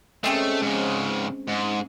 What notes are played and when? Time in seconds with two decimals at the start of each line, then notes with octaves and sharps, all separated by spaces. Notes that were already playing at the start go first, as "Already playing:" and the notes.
0.24 G#3 A3 C4 C#4
0.62 G#2 C#3
1.49 G#2